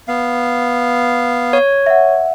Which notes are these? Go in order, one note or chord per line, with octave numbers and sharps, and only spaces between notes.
B3 F5
C#5
E5 F#5